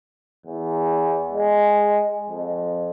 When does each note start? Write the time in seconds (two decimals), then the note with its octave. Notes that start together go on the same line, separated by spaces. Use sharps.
0.46 E2
1.32 G#3
2.29 F2